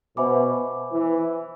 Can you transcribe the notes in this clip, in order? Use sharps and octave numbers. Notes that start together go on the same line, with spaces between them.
B2 C5 E5 G#5 B5 D6
E3